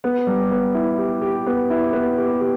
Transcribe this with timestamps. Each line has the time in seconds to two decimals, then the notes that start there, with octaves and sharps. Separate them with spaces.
0.04 B3
0.27 G3
0.51 B3
0.74 E4
0.98 G4
1.22 G4
1.46 B3
1.70 E4
1.93 B3
2.18 G4
2.41 G4